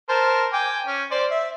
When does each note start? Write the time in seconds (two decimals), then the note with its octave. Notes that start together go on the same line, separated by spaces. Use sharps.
0.09 A#4 C5 A5
0.53 G5 G#5 D6
0.87 C#4
1.11 C5 D5
1.31 E5